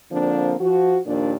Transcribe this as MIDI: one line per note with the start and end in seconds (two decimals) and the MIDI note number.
0.12 0.55 50
0.12 0.55 53
0.12 0.55 58
0.12 0.55 60
0.12 0.55 62
0.60 0.98 53
0.60 0.98 66
1.07 1.34 39
1.07 1.34 46
1.07 1.34 53
1.07 1.34 62
1.07 1.34 74